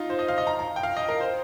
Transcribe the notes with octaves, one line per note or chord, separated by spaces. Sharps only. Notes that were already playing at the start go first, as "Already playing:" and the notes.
Already playing: D#4 F4
C5
D#5
F5
D#5
A#5
A#5
G5
F5
D#5
A#4
C5